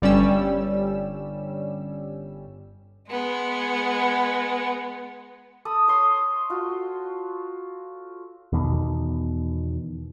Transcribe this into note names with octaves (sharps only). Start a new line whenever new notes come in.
G1 G3 C#4 E6
G#3 B3
A4 B5 D#6 E6
C#5 C6 D#6
F4 F#4
E2 B2 D#3